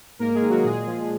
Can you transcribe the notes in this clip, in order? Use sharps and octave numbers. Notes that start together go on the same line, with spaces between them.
G#2 A#3 A#4
G#3 G#4
D#3
F#3 F#4
A#2 G#3 G#4
F3